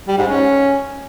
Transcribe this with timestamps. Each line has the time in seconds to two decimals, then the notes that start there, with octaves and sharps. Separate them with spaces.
0.08 G3
0.18 G#2
0.28 C#4